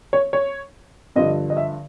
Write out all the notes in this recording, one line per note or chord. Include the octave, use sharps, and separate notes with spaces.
C#5
C#5
G2 D3 F3 D#5
D#5
E5